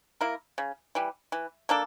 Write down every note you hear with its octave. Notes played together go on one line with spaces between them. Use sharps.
A#3 E4 A#4
C#3
E3 G3
E3
A#3 D4 A4